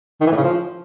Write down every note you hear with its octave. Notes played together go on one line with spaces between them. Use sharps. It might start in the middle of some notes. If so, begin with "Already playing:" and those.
D#3
E3
A2
C#3
F3